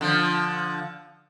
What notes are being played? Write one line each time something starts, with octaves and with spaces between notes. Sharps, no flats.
D3 F3